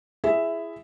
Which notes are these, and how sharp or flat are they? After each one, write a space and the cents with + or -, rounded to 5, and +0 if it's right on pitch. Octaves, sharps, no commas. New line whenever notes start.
E4 +20 G#4 +0 E5 +0